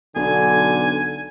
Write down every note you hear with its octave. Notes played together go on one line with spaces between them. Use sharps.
B1 D3 G#5